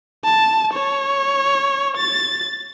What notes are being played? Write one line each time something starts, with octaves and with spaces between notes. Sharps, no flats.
A5
C#5
A6